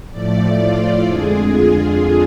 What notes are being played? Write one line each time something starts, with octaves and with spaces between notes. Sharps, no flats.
A2 F3 A3 D5
F4
F2 D3 G#3 G#4
F4